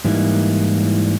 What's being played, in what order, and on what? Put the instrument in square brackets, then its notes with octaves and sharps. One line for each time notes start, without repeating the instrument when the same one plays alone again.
[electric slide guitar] G#2 E3 G3 A#3 D#4 E4